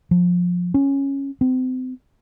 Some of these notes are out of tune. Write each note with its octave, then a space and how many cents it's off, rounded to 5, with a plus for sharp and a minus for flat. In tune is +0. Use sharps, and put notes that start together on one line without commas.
F3 +25
C#4 -5
C4 -35